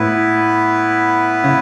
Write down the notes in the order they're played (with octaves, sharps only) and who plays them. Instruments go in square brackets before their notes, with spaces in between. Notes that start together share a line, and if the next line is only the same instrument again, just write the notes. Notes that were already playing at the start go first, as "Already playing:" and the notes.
Already playing: [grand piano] A2 [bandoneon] B3 E4 B4
[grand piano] C#3